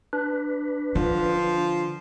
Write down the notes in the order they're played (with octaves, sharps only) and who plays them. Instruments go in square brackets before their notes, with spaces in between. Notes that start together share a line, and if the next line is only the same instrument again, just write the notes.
[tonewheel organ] D4 B4
[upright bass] D3 [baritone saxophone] F3